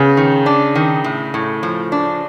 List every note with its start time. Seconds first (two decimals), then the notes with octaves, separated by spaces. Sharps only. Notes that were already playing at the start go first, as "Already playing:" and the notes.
Already playing: C#3 B3
0.17 D#3
0.46 D4
0.75 D#3
1.04 A2
1.34 A2
1.63 F3
1.92 D4